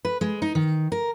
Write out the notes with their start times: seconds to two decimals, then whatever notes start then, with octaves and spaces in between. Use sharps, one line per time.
0.05 B4
0.21 G#3
0.42 D#4
0.55 D#3
0.92 A#4